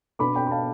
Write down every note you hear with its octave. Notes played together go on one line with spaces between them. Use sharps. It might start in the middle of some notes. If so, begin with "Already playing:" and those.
B2 B3 D4 B5 D6
G5 B5
B5
F5 A5